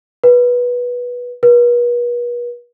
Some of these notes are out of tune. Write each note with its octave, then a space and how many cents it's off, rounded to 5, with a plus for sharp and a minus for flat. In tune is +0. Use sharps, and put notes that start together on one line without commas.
B4 -15
B4 -40